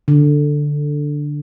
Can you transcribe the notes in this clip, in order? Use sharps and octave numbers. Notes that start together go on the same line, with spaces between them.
D3